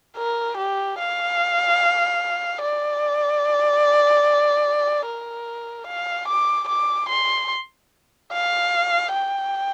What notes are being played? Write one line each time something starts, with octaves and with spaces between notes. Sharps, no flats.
A#4
G4
F5
D5
A#4
F5
D6
D6
C6
F5
G5